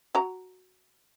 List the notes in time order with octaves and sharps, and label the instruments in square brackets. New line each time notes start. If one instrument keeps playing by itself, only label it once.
[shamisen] F#4 A#5